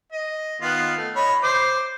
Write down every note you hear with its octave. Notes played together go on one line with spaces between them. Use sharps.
D#5
D#3 B3 F4
A3
C#5 D#5 B5
C5 D6